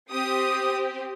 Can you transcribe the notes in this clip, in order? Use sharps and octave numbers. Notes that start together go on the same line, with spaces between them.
C4 G4 D#6